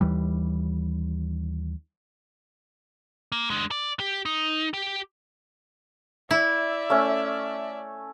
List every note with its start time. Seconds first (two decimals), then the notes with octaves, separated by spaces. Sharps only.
0.01 D#2 E3 G3
3.32 A#3
3.50 G#3 D4
3.71 D5
4.00 G4
4.25 D#4
4.74 G4
6.31 E4 D5 E5
6.90 A3 C#4